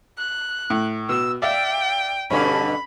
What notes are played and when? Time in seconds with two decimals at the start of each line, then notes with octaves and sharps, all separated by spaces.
0.18 F#6
0.70 A2
1.09 B2 E6
1.42 D5 E5 F5 G5
2.31 G2 B2 D3 C#4 B5